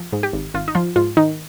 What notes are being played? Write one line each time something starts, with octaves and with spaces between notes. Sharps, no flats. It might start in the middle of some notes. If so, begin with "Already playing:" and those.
Already playing: F3
G#2
G4
G#1
G#1 F4
D#4
F3 F4
G#2 F4
D#3 D#4